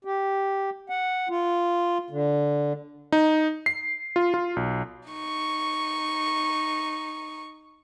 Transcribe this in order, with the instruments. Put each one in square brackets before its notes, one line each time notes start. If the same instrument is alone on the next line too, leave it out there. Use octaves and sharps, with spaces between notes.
[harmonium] G4
F#5
F4
D3
[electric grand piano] D#4
C7
F4
F4
B1
[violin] D#4 C#6